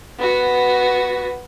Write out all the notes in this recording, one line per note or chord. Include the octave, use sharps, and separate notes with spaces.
B3 F#4